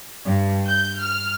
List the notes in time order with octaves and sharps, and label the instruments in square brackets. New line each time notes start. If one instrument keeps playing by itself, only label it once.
[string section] G2
G6
F6